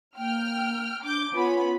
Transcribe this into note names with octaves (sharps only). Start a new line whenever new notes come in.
A#3 G5 F6
D4 D6 G6
B3 C#4 F4 B5